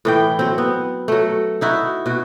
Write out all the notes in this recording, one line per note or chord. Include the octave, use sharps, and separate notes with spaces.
A2 E3 G5
F#3 C4
B3
F#3 A3
D#4 E4 F#4
B2 F#4